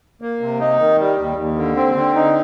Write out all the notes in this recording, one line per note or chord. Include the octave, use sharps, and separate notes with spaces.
A#3
C3
D#4
D#3
G3
D#2
D#2
D3
C4
D3
D#4